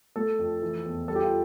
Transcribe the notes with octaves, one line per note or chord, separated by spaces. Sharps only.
A3 A4
F2
E3
E2
G3 A4
G4
F4